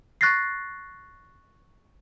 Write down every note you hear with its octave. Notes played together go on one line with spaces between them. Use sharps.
C#6 F#6 A6 A#6 C7